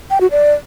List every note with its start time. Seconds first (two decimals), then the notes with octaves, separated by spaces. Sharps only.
0.10 G5
0.21 F#4
0.31 D5